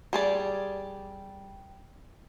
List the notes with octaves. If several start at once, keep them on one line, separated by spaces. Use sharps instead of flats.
G3 G#4 D5